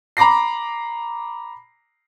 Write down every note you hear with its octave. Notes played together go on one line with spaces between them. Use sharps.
A#5 B5 D6 A#6 C7